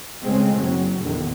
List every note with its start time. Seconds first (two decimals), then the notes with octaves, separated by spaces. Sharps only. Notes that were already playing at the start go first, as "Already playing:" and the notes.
0.21 C#2 C#3 G#3 A3 C4
0.56 F#1 F#3
0.99 A#1 E2 D3 D#3